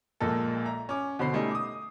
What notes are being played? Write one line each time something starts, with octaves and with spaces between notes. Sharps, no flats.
A#1 A#2 G#3 A#3 A4
E5 A#5
C#4 D6
B2 D3 C5 B5 C7
G3 A3 C#4 D#4
D6 D#6